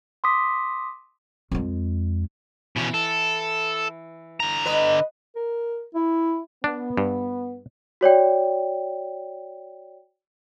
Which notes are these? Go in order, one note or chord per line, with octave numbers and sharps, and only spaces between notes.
C6 D6 D#6 B6
F2 G#3
B2 E3 C#4
A4
D3 A#5
B4 D#5
A#4
E4
B3 D4
G2
F#4 C#5 D5 G5